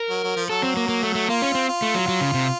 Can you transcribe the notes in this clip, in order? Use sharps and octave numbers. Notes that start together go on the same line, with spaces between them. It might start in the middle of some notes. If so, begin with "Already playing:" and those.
Already playing: A#4
F#3
F#3
F3
F#3 A4
C4
A#3
A#3
A3
A3
A#3 F4
C#4
C4
F4
A3
F#3
F#3
C#3
C3